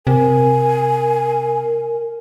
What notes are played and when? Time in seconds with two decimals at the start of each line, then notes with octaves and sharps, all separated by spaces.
0.07 C3 A#4 G#5